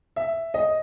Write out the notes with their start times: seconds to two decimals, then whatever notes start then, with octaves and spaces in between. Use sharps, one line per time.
0.16 E5
0.54 D#5